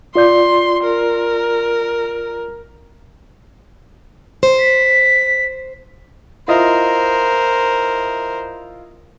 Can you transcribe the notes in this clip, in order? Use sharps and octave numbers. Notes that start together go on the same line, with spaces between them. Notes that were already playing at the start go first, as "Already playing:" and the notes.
F4 D5 C6 G6
A#4
C5
B6
E4 F4 A#4 C5 D#5